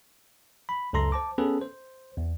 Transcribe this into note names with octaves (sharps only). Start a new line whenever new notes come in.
B5
C#2 F#2 A4 A#5 C6 A#6
C5 A5 D6
B3 C#4 G#4 A4 B4
C5
E2